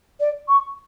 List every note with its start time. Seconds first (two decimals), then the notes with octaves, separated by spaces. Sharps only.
0.20 D5
0.48 C#6